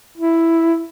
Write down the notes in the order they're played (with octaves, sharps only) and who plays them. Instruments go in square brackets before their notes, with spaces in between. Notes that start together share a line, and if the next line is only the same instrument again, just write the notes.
[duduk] E4